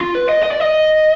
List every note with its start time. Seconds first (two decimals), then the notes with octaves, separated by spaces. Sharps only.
0.01 F4
0.15 B4
0.29 D#5
0.43 D#5
0.51 D5
0.60 D#5